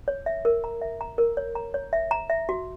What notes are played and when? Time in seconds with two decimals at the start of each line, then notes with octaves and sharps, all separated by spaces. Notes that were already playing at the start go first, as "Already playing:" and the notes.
0.08 C#5
0.26 E5
0.45 A#4
0.64 A#5
0.81 E5
1.01 A#5
1.18 A#4
1.37 C#5
1.55 A#5
1.74 C#5
1.93 E5
2.11 A#5
2.30 E5
2.49 F#4